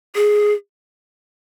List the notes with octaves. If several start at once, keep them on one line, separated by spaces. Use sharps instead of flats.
G#4